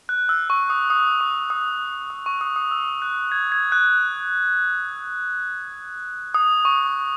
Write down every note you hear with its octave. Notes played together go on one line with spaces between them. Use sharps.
F#6
E6
C#6
D#6
D#6
C#6
D#6
D#6
C#6
D#6
D#6
E6
F#6
G#6
G#6
F#6
D#6
C#6